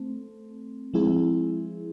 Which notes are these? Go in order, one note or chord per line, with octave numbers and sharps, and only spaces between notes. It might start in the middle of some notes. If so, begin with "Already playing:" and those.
Already playing: A3 C4
F3 G#3 C4 E4 G#4